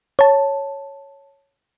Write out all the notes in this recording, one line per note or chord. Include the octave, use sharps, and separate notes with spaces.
C#5 A5